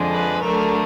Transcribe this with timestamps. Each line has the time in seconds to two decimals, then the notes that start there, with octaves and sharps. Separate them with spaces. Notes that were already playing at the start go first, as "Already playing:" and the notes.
Already playing: F2 D3 F3 G#3
0.11 B4
0.42 D2 D3 F#3 A3 A#4